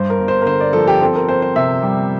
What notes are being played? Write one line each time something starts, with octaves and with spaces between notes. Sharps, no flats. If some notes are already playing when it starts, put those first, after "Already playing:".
Already playing: G2 C5
A#4
G1
C5
A#4
D3 C5
D5
F3 A4
G4
C4 A4
A#4
C4 C5
C5
C3 E5
G3